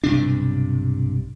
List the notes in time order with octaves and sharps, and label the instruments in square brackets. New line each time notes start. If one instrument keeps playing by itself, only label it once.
[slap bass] B1 G2 C3 D4